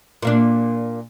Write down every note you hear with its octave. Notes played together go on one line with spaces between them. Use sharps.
A#2 A#3 D4